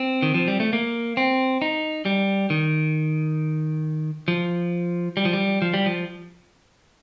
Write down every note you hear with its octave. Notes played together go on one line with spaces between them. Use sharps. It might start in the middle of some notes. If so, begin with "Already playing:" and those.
Already playing: C4
D#3
F3
G3
A3
A#3
C4
D#4
G3
D#3
F3
G3
F3
G3
F3
G3
F3